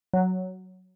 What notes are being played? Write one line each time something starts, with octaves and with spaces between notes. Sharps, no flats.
F#3